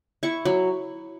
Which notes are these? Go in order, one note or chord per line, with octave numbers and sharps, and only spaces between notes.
E4 C#6
F#3